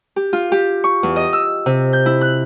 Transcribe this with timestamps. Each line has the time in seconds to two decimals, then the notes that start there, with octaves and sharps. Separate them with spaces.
0.16 G4
0.33 F4
0.52 G4
0.84 C#6
1.03 E2
1.16 D#5
1.33 E6
1.66 C3
1.93 G6
2.06 E4
2.21 F#6